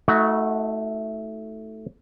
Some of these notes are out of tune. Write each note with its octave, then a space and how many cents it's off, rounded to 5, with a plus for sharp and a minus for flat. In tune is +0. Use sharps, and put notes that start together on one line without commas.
A3 +0 D#4 +45 F#4 +0